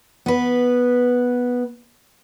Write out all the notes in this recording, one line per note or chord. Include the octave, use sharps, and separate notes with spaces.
B3 B4